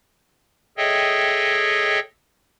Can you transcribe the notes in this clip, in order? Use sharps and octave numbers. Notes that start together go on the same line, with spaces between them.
G#4 A4 C#5 D#5 E5 G5